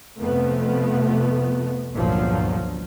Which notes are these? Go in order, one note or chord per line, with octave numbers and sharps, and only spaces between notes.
F2 C3 F3 A3 B3
G1 C#2 G2 A#2 F3 F#3